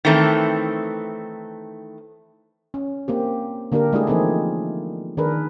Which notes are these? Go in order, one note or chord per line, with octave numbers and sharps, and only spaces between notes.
D#3 E3 A3 C4
C#4
A#3 C4 G4
D3 A#3 D4 G4 A#4
G#3 A3 D4 E4 G4 G#4
E3 F3 A#3 C4 D#4 G#4
D#3 D4 G#4 A#4 B4